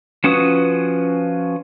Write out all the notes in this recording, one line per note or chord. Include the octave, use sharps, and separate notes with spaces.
F3 C#4 F#4 B4 D#6